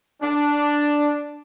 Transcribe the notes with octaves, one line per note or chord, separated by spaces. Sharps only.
D4